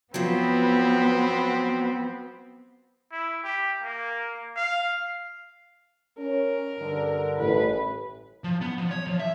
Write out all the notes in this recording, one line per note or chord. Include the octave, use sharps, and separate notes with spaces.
F3 F#3 B3 C4
E4
G4
A#3
F5
C#4 A#4
G2 D3
A1 B4
F3
B3
F3
C#5
F3
E5